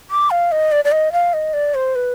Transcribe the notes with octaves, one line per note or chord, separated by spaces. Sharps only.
D6
F5
D#5
D5
D5
D#5
F5
D#5
D5
C5
B4